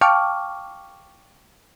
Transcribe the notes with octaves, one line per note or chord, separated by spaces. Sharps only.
F5 G5 A5 C#6 D6 F6